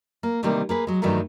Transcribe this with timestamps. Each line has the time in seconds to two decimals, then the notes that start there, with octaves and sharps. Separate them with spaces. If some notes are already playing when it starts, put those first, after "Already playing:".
0.23 A#3
0.43 C3 D#3 E3 G3 A#3 C4
0.69 A#3 G#4 B4
0.87 F#3 G#3
1.02 G2 D#3 E3 F#3 A3 A#4